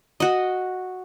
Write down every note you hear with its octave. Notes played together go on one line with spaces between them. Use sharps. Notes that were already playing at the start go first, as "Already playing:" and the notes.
F#4 D#5